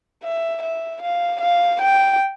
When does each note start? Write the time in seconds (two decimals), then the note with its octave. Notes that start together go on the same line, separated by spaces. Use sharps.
0.23 E5
0.63 E5
1.02 F5
1.41 F5
1.82 G5